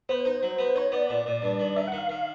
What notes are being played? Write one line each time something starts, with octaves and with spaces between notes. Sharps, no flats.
B3 C5
D#4
F#3
B3
D#4 C#5
B3 D5
A#2
A#2
G2
D#3
D#3 E5
F#5
D#3
F5
D#3